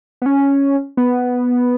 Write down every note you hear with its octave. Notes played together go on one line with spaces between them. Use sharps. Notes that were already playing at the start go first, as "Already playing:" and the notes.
B3
C#4
B3